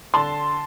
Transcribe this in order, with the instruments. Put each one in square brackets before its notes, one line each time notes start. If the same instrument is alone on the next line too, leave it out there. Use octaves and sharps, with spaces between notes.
[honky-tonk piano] D3 A5 C6